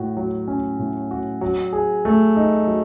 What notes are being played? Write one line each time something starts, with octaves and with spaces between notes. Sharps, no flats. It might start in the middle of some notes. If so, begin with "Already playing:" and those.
Already playing: A2 F#4
F#3
C#4
A2
F#4
F#3
G#4
A3
D#4
F#3